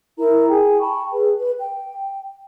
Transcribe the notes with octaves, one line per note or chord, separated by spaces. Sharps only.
E4 A#4 A#5
G#4 G5 G#5
G5 A5 B5 C#6
G#4 B4
B4
G5